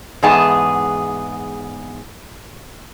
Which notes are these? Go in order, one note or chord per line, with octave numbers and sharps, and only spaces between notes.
E2 G#2 B3 G#4 A5